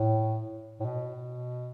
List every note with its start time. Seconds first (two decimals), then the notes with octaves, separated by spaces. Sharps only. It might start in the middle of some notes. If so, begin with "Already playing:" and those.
Already playing: A2
0.80 A2
0.85 B2